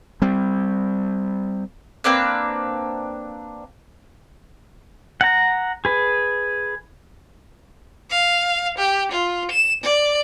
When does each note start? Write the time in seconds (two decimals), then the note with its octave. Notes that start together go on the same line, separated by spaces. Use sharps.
0.22 G3 C4
2.04 A#3 C4 D4 B4
5.21 F#5 A#5
5.85 G#4 B4
8.10 F5
8.78 G4
9.12 F4
9.51 E7
9.83 D5